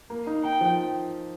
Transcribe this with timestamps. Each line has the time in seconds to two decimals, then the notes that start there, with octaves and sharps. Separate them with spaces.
0.10 A#3
0.27 D#4
0.43 D#4 G5
0.61 F3